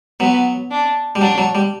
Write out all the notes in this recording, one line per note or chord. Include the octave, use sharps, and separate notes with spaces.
F#3 B3
D4
G3
F#3 D4
F#3
G3